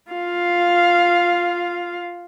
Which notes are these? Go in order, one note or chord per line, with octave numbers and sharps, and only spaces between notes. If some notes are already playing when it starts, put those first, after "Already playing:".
F4 F5